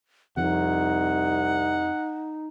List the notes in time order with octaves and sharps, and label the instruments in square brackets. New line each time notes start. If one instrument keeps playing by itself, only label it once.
[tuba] C2 [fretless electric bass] F2 F3 [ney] D#4 [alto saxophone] F#5